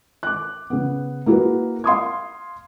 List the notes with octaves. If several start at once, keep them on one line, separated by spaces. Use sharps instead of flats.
D6 F#6
C#3 B3
A#3 E4 F#4 G#4 B4
F5 C6 D#6 G#6